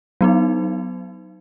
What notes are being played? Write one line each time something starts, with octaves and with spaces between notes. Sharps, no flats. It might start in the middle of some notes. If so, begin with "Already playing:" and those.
F#3 B3 D#4